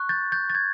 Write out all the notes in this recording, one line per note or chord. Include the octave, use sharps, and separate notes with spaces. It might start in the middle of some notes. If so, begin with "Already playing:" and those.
Already playing: C#6 F#6
G6 A6
G6 A6
A6
G#6